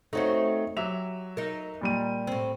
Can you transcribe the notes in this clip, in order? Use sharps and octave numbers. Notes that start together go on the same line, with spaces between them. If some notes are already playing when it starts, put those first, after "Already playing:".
A3 C4 D#4 F#4 C#5
F#3 G4 E5 F7
D#4 A#4
A#2 G3 D#7
A2 C4